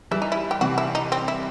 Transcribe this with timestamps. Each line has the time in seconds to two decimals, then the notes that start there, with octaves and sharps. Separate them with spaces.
0.11 E3 G3 E4
0.22 D#4
0.32 E4
0.51 G4
0.61 C3 E3 F#4
0.78 E4
0.95 D#4
1.12 C4
1.28 E4